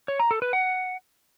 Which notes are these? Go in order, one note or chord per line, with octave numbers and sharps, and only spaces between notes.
C#5
A#5
A4
B4
F#5